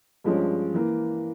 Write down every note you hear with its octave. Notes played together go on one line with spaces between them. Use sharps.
G2 F3 G#3 C#4
E3 A#3